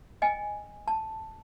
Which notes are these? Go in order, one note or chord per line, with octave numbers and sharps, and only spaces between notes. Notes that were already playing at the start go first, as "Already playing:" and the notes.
D#5 G5 G#5
A5